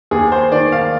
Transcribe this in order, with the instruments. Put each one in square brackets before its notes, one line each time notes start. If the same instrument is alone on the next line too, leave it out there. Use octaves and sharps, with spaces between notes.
[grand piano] D#2 G#4
C5
D#3 D5
F5